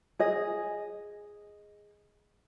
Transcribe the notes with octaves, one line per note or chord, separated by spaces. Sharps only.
G#4 D#5